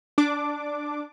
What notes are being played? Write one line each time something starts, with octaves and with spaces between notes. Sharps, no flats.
D4 D6